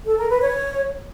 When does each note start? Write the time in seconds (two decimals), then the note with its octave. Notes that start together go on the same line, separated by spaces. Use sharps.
0.06 A4
0.18 A#4
0.30 B4
0.41 C#5